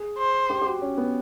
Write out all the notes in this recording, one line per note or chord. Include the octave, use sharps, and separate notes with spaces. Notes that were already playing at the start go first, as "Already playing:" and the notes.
Already playing: G#4
C5
G4
G4
F#4
C#4
B3